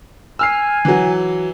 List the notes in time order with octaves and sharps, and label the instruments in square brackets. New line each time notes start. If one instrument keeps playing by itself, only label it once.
[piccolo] G#5 [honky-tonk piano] E6 F6 C7
[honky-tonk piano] E3 F#3